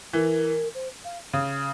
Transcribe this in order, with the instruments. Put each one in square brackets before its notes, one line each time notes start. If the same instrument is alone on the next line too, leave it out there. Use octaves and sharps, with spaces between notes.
[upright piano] E3 [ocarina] A#4
[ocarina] C5
F5
[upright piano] C#3